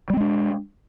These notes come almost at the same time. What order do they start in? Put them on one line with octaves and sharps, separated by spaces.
G3 C4 G#3 D4